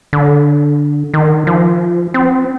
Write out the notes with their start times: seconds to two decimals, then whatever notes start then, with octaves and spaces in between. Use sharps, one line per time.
0.13 D3
1.14 D#3
1.47 F3
2.14 C4